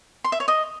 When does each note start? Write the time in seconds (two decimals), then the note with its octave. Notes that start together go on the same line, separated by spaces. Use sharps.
0.24 C6
0.32 E5
0.40 C#5
0.48 D#5